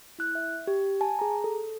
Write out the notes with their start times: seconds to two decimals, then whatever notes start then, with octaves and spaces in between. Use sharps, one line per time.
0.19 E4 F#6
0.35 E5
0.67 G4
1.01 G#5 A5
1.19 G#4 A#5
1.44 A4